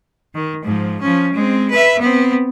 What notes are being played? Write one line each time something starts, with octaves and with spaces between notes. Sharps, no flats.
D#3
G#2 F3
F3 C#4
G#3 C4
B4 E5
B3 C4